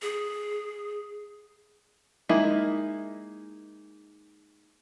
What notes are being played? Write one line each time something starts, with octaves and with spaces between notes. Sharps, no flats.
G#4
G#3 A#3 D#4 E4